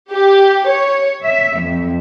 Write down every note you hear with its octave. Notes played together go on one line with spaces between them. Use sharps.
G4
C#5
E5
F2